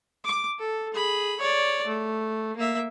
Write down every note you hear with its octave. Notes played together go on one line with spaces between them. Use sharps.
D6
A4
G#4 B5
C#5 D5
A3
A#3 E5